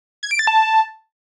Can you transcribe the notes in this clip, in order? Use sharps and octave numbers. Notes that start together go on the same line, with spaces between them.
G#6
D7
A6
A5